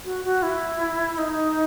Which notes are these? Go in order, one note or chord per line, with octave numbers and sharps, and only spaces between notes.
F#4
F#4
E4
D#4